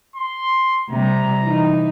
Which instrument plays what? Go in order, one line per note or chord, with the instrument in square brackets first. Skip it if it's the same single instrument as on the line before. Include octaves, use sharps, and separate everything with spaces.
[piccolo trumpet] C6
[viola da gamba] C3 G3 [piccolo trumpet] A#5
[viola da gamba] E3 D#4